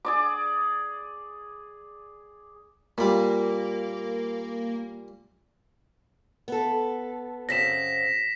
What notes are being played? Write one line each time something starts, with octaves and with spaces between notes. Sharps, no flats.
G#4 D5 D6
A#2 G3 A#3
B3 A4
F#2 C#3 C4 A#6 B6 E7